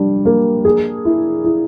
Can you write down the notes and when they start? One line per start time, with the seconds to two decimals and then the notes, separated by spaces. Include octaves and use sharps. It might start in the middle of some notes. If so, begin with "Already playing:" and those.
Already playing: G3 D4
0.25 A#3
0.65 G#4
1.05 E4
1.45 E4